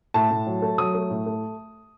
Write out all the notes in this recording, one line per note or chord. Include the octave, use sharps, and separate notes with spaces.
A2 A5
A2
F#3
A3
F#3 D#6
A3
A2
A3